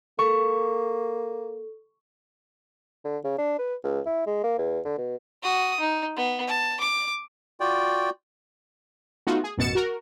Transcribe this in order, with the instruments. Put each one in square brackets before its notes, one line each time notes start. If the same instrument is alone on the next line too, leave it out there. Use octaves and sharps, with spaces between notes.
[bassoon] A#3 [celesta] A4 [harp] C#6
[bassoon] D3
C#3
D4
B4
C#2
E4
G#3
A#3
E2
D3
B2
[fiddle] F#4 D#6
D#4
B3
A5
D6
[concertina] F4 F#4 D5 G5
[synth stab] A3 B3 D#4 F4 F#4
G#4
A1 F#2 B2 A6 C#7 E7
F#4 A#4